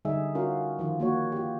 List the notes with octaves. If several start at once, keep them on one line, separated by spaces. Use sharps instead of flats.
D3 G3 D#4 G#4 E5
C#4 F4 F#4 A#4 F5
D#3 F3 F4
A#3 F#4 C#5
F4 G4